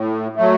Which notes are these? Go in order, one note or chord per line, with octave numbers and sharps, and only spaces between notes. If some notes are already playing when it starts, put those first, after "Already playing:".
Already playing: A2
F#3 A3